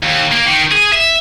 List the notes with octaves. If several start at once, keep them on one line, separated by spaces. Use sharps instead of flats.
D#2
A#3
D#3
G#4
E5